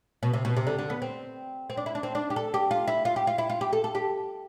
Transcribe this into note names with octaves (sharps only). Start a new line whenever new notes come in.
B2
C3
B2
C3
D3
D3
B3
C4
C4
D4
E4
D4
C4
D4
G4
A4
G4
F4
E4
F4
G4
F4
E4
F4
G4
A4
A4
G4